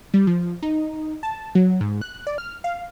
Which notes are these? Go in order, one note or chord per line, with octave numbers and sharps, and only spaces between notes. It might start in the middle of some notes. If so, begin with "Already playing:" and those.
G3
F3
D#4
A5
F#3
G#2
F#6
D5
F6
F5